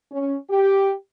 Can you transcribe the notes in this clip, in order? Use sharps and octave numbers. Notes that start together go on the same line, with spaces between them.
C#4
G4